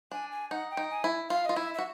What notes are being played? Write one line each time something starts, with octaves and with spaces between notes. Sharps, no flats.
D4 G#5
G#5
D#4 F#5
G5
D#4
G#5
E4
F4 F5
F4 D#5
E4 E5
E5
F#4